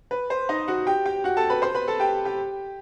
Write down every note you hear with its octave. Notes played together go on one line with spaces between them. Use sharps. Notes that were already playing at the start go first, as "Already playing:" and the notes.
B4
C5
D#4 D#5
F#4 F#5
G4 G5
G4 G5
F#4 F#5
A4 A5
B4 B5
C5 C6
B4 B5
A4 A5
G4 G5
G4 G5